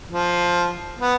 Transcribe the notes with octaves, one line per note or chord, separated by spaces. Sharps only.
F3
B3